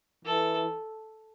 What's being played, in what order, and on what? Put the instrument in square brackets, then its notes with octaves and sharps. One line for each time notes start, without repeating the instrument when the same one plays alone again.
[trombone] E3 [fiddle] A4